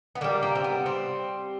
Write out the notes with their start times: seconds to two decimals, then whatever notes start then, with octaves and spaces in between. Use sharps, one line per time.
0.15 B3
0.21 D3 A#3
0.24 G3
0.43 A#3
0.55 C4
0.64 B3
0.86 C4